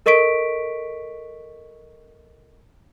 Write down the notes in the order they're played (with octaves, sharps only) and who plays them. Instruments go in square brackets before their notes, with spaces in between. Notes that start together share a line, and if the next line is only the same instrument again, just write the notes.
[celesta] A4 A#4 D#5 C#6 B6 D7